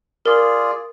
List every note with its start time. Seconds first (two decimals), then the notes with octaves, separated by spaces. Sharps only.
0.26 F4 G#4 A#4 D5